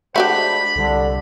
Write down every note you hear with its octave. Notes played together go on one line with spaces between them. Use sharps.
G#3 A3 D4 F#4 G4 C5 B5
C2 D3